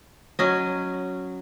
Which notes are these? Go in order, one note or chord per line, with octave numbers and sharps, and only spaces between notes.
F#3 C#4 D#5